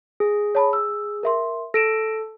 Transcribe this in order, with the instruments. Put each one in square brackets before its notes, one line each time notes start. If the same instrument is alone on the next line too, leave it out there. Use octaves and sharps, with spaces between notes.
[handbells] G#4
[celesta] C#5 A5 B5
E6
A#4 E5 C6
[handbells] A4 [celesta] A#6 D7 E7